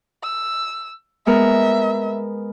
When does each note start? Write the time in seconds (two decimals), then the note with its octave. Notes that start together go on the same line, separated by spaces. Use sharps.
0.24 E6
1.27 G#3 B3 A#4 E5